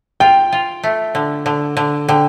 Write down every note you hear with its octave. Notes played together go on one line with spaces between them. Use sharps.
F4 G5
F4
A3
D3
D3
D3
D3 G5